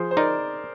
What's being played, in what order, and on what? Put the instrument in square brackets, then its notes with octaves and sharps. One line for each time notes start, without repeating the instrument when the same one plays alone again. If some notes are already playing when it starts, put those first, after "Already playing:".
Already playing: [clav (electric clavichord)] F3 [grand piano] G#4 C5
[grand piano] C5
[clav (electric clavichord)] D#4 [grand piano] A#4 D5